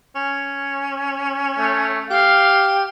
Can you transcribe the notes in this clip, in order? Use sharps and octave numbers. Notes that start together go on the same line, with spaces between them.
C#4
A3
G4 F5